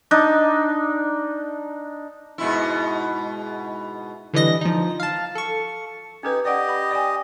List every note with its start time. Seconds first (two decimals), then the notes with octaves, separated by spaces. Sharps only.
0.11 D4 D#4
2.38 G#2 B2 E4
4.33 D3 E3 G3 D#5 A#6
4.61 F3 D#4
5.00 F5 A5
5.35 A4 C#6
6.23 C#4 D#4 G4 A4 B4
6.45 G4 D5 D#5 F#5
6.68 B5
6.91 D5 G5 G#5